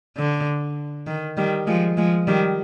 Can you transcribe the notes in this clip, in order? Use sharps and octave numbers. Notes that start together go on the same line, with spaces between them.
D3
D#3
D#3 G3
F3 G#3
F3 G#3
D#3 G3